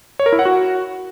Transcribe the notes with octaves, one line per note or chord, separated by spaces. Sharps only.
C#5
A#4
E4
F#5
F#4